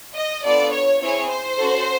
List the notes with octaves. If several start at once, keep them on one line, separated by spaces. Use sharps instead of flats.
D#5
B3 D4 F4 A4 D5
C#5
C4 E4 G#4 C#5
C5
C#4 F#4 A4